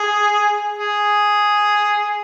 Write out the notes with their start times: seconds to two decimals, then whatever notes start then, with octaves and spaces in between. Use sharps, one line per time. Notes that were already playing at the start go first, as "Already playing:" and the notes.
Already playing: G#4
0.78 G#4